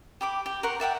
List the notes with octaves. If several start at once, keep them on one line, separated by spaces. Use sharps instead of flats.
G4 B5 D6
G4
A#4 F#5 C6 C#6
D5 E5 F#5 G5